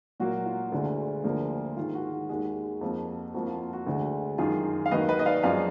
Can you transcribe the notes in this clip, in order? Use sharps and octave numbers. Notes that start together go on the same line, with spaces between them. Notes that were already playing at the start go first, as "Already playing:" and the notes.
A#2 F#3 A#3 F#4
F4
D2 D3 G#3
D2 D3 F3 A#3
G#2 D#3 G#3 F4
F#4
F#4
D#2 D#3 G#3
F2 F3 A#3
F2 F3 A#3 F#4
F4
F#4
D2 D3 G#3
F#2 D#3 G#3 F4 G#4
F5
D#2 D#3 F#3 A#3 B4 D#5
B4 D#5
D#5
D5 F5
F#2 F3 G#3 D5 F5